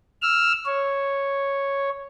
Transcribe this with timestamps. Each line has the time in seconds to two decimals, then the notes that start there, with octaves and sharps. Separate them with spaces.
0.22 E6 F6
0.65 C#5